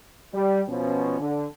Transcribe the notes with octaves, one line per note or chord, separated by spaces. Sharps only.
G3
B2 F3 C#4
D3